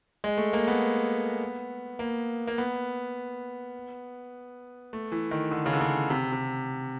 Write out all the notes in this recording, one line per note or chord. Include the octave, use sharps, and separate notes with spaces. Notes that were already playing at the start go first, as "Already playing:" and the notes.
G#3
A3
A#3
B3
A#3
A#3
B3
A3
E3
D#3
D3
C#3
D3
C#3
C3
C3